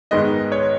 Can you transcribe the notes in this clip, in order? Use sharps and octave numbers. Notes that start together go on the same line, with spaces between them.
G#2 D#3 G#3 B3 D#5
C#5